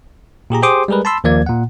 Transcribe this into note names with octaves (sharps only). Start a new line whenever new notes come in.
A#2 G4 G#4 A#5
G4 G#4 C5 C6 D6 D#6
G3 G#3 G#4 A#4 B4
A5 B5 C6 E6
D#2 F3 A#3 D5 G#6
A#2 F#5